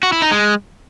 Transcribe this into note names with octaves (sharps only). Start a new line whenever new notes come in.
F#4
E4
D#4
G#3